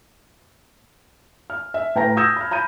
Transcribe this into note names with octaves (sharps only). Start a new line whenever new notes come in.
F6
E5
A2 B4 G5 A5 A#5 A#6
D#6 E6 G6 G#6 A#6 E7
B5 F6
A#5 B5 G6 D#7